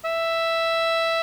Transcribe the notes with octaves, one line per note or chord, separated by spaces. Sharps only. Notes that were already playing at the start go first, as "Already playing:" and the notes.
E5